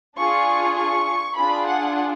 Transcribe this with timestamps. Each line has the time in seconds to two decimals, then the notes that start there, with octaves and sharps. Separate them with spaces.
0.18 D4 F4 G#4 C#6
0.77 C#6
1.37 D4 F4 G#4 B5
1.67 F#5